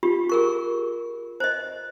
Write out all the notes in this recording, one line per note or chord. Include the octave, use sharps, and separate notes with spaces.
F4 G4
G#4 A#4 C#6
C5 D#5